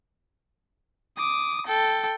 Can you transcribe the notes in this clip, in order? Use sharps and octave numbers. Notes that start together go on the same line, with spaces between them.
D6 D#6
A4 G5